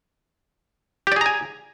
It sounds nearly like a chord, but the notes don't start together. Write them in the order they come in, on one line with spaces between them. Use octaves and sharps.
G4 D5 G#4 A#5 G#5